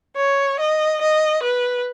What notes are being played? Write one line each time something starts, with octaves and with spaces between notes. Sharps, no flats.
C#5
D#5
D#5
B4